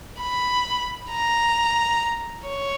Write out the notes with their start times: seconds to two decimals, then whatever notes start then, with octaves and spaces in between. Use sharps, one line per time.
0.20 B5
1.11 A#5
2.47 C#5